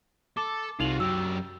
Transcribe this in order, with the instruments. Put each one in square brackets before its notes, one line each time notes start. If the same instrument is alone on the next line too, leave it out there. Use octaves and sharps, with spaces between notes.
[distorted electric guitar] A4 [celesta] D6
[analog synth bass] C2 [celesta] D#4 F7 F#7 [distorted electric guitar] F4 F#4
[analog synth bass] F#2 [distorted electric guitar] F#3 G4 [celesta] E6